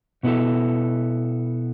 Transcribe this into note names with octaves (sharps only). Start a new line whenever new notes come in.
B2 B3 E4 A4